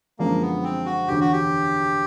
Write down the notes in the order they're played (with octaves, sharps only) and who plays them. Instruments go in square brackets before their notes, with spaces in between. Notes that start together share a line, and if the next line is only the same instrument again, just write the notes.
[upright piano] F#2 D3 F3 G#3 [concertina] A#3
[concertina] B3
C4
F#4
[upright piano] E1 D2 D3 [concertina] G4
[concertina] F#4
G4